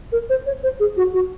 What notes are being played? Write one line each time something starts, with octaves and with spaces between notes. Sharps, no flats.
A#4
C5
C#5
C5
G#4
F#4
F#4